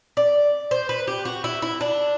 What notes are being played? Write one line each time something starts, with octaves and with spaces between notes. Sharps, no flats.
D5
C5
B4
G4
F#4
E4
E4
D4